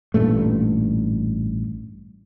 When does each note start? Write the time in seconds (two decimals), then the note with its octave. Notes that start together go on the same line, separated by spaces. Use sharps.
0.14 A1 G2 A#2 A3